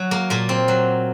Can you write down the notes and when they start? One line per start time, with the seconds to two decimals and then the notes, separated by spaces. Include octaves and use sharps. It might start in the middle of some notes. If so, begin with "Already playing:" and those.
Already playing: F#3
0.11 A#3
0.30 A#2 A#3
0.49 C4
0.68 F#3